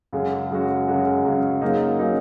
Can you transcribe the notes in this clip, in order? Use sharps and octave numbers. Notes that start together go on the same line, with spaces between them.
F#2 C#3 G#3 F#4
F#2 C#3 G#3 F#4
F#2 C#3 G#3 F#4
F#2 C#3 G#3 F#4
F#2 C#3 F#3 A#3 D#4
C#3 F#3 A#3 D#4